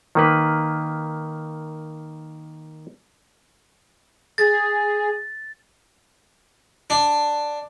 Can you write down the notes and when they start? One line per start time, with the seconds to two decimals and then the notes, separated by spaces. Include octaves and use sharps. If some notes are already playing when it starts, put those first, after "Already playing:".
0.15 D#3 A#3 B4
4.38 G#4 A6
6.90 D4